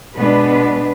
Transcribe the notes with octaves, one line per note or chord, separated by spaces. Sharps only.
B2 G#3 B3 D4 B4